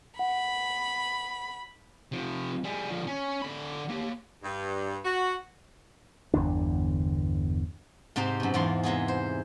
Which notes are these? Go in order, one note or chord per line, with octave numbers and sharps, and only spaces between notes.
F#5 B5
C3 F3
G3 G#4
D3 F3
C#4
D3 B5
A#3 G4
G2
F#4
G1 E2 D3 D4
G#2 C3 C4 D#4 G4
F#2 B2
E2 G#2 E4 F4 C6
C3 G#3 B3 G#4
C5